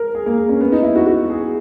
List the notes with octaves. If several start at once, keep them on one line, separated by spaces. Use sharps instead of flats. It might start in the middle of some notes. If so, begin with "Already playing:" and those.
Already playing: A#4
G#4
A#3
A#3
C#4
B3
D#4
E4
F#4
F#4
G#4